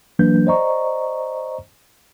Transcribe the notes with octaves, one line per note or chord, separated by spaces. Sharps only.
E3 F#3 A#3 D4 B4 G6
C5 D5 D#5 A#5 C#6